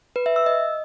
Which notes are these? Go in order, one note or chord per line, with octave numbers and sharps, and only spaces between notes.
B4
E5
E6
D#5